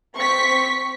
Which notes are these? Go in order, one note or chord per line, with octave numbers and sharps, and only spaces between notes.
C4 C#6 B6